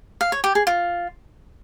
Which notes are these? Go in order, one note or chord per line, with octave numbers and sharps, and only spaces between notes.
F5
C#5
G4
G#4
F4